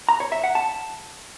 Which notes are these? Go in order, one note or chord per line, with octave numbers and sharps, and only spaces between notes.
A#5
C#5
E5
F#5
A5